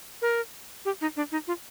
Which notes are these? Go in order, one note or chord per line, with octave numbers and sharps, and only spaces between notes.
A#4
G4
D#4
D4
D#4
F4